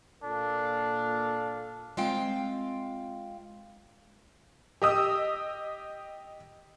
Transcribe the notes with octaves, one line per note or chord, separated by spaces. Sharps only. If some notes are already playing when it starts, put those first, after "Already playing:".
A#2 D4 A4 F5
G#3 C4 F4 F5 G5
G4 D#5 D#6 E6